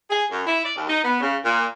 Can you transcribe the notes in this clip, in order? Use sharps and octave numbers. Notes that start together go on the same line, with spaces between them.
G#4
F#2
E4
D5
D#2
D#4
B3
C#3
A#2